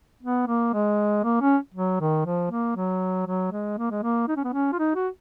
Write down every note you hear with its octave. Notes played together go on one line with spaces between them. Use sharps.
B3
A#3
G#3
A#3
C#4
F#3
D#3
F3
A#3
F#3
F#3
G#3
A#3
G#3
A#3
D#4
C#4
B3
C#4
F4
D#4
F#4